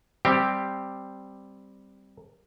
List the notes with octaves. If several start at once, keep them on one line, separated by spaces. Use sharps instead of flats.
G3 C4 G4